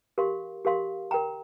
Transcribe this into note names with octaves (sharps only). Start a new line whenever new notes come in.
G4 A#4 F5 C6
G4 A#4 F5 C6
A#4 G5 A#5